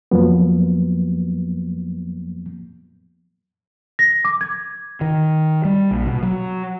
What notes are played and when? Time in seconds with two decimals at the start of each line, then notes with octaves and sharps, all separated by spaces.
0.11 F2 F3 F#3 A#3 B3
3.99 A#6
4.25 D6
4.41 G#6
5.01 D#3
5.65 G3
5.91 A#1
6.07 B2
6.23 F#3